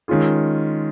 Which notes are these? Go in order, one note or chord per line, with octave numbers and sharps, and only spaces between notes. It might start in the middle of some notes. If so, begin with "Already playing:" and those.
D#3 G#3 C#4 F4 G#4